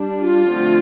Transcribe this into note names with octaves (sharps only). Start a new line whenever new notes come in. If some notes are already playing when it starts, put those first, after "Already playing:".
Already playing: G3 D4
F4
D3 F3 A3 C4